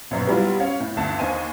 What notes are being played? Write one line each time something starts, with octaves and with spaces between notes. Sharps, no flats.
A#1 F#2 B2
F#3 G3 B3 E4 F4
C#4 C#5 F5
A2
G1 D2 D3 A5
D#2 D#4 C5 G#5 D#7